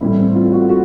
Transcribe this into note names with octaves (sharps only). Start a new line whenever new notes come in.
A1 A2 E3 G3 E4
C4
F4
F#4
F#4